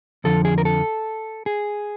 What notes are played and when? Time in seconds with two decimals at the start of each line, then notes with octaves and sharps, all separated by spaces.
0.24 F2 D3 F3 A4
0.45 G#4
0.58 A#4
0.65 A4
1.46 G#4